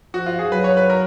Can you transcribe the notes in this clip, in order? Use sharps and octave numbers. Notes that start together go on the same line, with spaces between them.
F3 F#4
F4
G#4
F#3 B4
C#5
B4
A#4